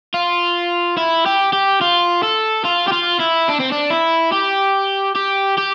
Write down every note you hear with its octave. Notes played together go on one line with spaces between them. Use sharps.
F4
E4
G4
G4
F4
A4
F4
G4
F4
E4
D4
C4
D4
E4
G4
G4
G4